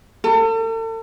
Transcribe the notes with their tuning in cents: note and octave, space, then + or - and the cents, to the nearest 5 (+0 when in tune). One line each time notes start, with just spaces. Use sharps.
A4 +40